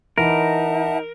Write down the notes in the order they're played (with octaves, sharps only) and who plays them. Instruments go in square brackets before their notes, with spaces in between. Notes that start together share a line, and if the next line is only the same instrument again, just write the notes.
[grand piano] E3 [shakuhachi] D#4 [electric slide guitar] A#4 [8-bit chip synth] E5 F#5 A5